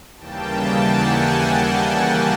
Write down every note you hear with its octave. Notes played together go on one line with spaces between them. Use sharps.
D#2 C#3 E3 G3 A#3 G5 A5
F#5 G#5
F#5 G#5